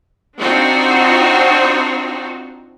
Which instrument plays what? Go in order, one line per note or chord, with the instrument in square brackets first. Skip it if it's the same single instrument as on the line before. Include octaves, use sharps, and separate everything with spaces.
[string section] C4 D4 D#4 F4 F#4